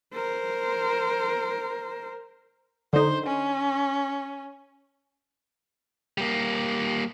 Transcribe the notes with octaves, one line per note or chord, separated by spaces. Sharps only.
A#4 C5
D3 D#4 C5
C#4
G3 A#3